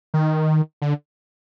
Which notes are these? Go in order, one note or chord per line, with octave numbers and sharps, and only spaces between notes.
D#3
D3